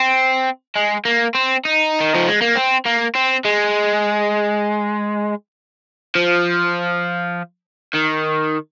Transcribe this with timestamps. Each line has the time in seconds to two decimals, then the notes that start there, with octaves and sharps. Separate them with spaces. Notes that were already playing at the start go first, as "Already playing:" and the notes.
Already playing: C4
0.76 G#3
1.05 A#3
1.35 C4
1.65 D#4
2.00 D#3
2.15 F3
2.28 G#3
2.42 A#3
2.55 C4
2.85 A#3
3.15 C4
3.45 G#3
6.15 F3
7.95 D#3